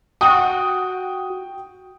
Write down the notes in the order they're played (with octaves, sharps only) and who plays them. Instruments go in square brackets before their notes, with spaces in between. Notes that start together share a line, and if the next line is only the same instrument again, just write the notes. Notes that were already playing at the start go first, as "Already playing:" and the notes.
[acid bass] F#4 [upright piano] G5 D#6